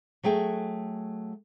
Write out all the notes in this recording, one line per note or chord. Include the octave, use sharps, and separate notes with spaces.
F#3 A3 G#4 G5